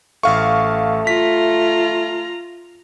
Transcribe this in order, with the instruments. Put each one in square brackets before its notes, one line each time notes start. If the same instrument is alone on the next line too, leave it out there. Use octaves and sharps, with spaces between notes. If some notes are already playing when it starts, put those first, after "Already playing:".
[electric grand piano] A1 F5 C#6 [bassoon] A3
[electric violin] F4 A#5 [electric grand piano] B6